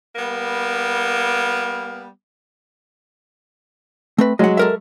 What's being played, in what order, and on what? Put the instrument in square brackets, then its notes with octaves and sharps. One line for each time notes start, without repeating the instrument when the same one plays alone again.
[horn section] G3 A#3 B3
[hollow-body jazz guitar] A3 C4 B4
[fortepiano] F#3 G#3 [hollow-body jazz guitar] D#5 F#5
[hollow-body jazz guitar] A4 A#4 E5